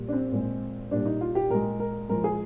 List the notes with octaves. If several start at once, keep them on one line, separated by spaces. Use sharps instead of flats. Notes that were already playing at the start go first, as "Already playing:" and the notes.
Already playing: A#2 G3
D4
C4
A#2 G#3
A#2 G3 D4
D#4
F4
G4
A#2 G#3 A#4
A#4
A#2 F3 G#3 A#4
G#4